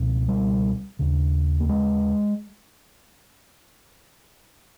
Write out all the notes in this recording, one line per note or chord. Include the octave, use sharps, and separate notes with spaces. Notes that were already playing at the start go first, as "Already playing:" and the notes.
Already playing: C#2 B2
G3
D#2 C#3
A#3
G#3